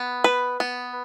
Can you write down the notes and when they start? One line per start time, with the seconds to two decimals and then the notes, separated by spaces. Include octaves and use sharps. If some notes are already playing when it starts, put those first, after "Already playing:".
Already playing: B3
0.24 B4
0.60 B3